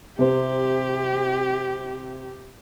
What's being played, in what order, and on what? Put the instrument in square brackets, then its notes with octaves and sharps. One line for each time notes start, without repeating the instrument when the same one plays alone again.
[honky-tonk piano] C3 C5 [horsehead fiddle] G4